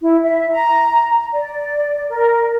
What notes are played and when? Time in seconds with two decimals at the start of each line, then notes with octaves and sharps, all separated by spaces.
0.02 E4
0.24 E5
0.52 A#5
1.33 D5
2.09 A#4